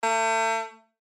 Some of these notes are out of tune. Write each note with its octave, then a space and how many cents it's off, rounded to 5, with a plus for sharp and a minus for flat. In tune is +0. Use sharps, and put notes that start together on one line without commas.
A3 +40